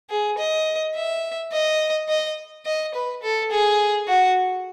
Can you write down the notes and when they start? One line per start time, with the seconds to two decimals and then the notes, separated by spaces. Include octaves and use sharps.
0.10 G#4
0.38 D#5
0.95 E5
1.52 D#5
2.09 D#5
2.66 D#5
2.94 B4
3.23 A4
3.51 G#4
4.08 F#4